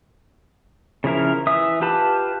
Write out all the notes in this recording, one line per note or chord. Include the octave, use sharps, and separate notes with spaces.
C#3 F3 E4 A#4
E3 E5 D#6
F4 G4 B4 A5 B5